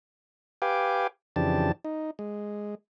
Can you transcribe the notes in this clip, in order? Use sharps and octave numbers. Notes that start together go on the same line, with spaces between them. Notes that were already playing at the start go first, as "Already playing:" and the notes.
G4 B4 F5 G5 G#5 D6
F2 C#3 E3 D4 G4 A5
D#4
G#3